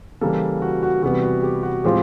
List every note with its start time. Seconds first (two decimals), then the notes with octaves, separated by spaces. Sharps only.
0.21 C#3 E3 G3 A#3 A4
0.62 F#4
0.83 F#4
1.03 C3 E3 G3 B3 F#4
1.23 F#4
1.43 G4
1.63 F#4
1.84 A2 F3 G#3 C4 F4 G4